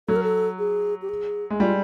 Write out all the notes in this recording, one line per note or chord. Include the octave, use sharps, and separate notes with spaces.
F#3 A4
A#4
A4
G#4
G4
G#4
G#3
G3 F4